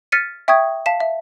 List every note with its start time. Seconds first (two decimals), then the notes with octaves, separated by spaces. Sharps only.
0.12 F6 A6 B6 C#7 D#7
0.48 E5 G5 C#6 D#6 G#6
0.86 F5 A5 B6 E7
1.00 E5